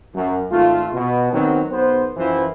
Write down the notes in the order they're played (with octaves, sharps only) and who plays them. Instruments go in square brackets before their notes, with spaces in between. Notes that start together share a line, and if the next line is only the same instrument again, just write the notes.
[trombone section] F#2
G#1 A3 F4
B2
D#3 F#3 B3 C4
B1 B3 C5
F#2 E3 F3 E4 C5